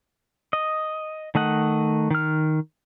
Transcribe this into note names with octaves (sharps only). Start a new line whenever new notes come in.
D#5
D#3 A3 D#5 F#5
D#3 F6